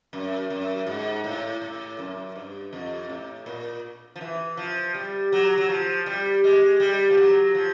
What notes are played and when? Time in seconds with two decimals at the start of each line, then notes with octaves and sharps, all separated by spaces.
0.13 F#2
0.50 F#2
0.87 G#2
1.24 A2
1.62 A2
1.99 F#2
2.35 G2
2.73 F2
3.09 A2
3.46 A#2
4.16 F3
4.21 E3
4.57 F3
4.94 G3
5.32 F#3
5.58 F#3
5.69 F3
6.06 G3
6.44 G#3
6.80 G3
7.10 F3
7.17 F#3
7.55 F3